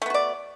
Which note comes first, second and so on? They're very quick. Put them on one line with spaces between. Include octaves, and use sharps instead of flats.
A3 B3 F#4 D5